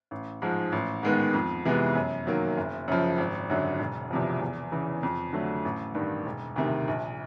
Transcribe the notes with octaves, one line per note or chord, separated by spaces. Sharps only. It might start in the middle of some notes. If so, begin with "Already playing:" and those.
A1
G#2 F3 G#3
A1
G#2 D#3 G#3 B3
F2
C3 E3 G#3 B3
F#2
D#3 F#3 A#3
F#1
F#2 C#3 F3
G#1
F#2 D3 F#3
E1
E2 C3 F3
E2
C#3 E3
F2
D3 F#3 A3
A1
G2 D#3 G3
E1
D2 C3 D#3
A#1